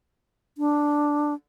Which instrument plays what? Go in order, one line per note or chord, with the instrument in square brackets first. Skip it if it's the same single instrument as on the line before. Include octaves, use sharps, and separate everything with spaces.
[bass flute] D4